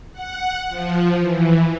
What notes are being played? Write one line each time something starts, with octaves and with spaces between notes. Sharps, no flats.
F#5
F3
E3